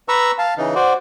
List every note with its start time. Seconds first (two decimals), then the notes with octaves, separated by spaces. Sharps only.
0.09 B4 A#5 C#6 E6
0.38 F5 A5
0.58 C#3 E3 D#4
0.75 F#4 C5 D5